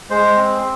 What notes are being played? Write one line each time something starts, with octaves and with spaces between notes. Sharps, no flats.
G#3 C5
C4